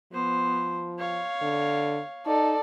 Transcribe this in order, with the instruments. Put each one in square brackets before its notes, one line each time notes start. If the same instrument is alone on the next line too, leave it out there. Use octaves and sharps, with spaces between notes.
[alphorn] F3 [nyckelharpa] B3 C5
[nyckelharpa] C#5 F5
[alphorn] D3
[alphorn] D#4 [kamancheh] A4 D5